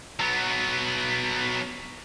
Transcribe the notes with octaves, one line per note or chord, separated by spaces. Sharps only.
F#3 B3